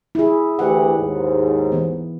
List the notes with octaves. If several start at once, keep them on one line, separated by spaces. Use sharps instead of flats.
E4 G#4
D2 E3 G4 F#5
D#2 G#2
E3 B3